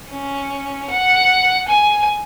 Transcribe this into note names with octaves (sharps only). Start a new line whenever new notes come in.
C#4
F#5
G#5